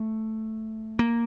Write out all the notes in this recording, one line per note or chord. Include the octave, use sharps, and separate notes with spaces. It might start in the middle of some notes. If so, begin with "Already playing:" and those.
Already playing: A3
A#3